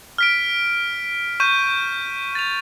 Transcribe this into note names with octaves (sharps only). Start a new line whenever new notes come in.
F6 B6 D7
C#6 G6 D#7
A6 F7